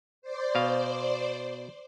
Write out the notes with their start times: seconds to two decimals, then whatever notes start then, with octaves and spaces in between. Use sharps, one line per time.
0.22 C5 D5
0.55 B2 F5